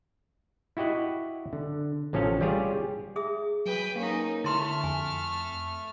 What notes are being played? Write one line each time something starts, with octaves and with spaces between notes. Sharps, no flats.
E4 F#4 G4 D#5 F#5
D3
A1 F3 C#4 A4 F5
G3 F4 G4 G#4 C#5
G#4 E5 D#6
F#3 B4 G5
A#3 C#4 D#4 A#4 F5
D3 A3 E4 C6 F6
F2 G#5